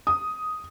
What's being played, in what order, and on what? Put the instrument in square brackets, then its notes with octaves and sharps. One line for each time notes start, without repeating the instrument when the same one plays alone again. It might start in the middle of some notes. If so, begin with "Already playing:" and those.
[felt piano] D#6